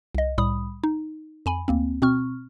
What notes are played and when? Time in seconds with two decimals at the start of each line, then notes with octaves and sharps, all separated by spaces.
0.15 C2 D#5
0.38 C2 A2 G3 B5 D#6
0.84 D#4
1.46 F2 G#5 B5
1.68 D2 A#3 C4
2.02 B2 C4 C#6 F6